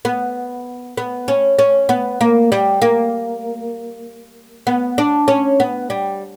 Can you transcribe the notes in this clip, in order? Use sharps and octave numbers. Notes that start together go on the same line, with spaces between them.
B3
B3
C#4
C#4
B3
A#3
G3
A#3
B3
D4
C#4
B3
G3